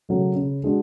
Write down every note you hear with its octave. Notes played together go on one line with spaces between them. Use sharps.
C#3 F#3 A3
C#3
G#3 D4 F#4